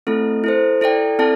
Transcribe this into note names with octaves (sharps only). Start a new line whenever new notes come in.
A3 C4 E4 A4
E4 A4 C5
E4 A4 D5 G5
C4 E4 A4 D5 A5